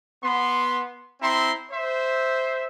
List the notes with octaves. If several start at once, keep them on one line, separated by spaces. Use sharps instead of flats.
B3 C6
C4 E4 A#5 C6
C5 E5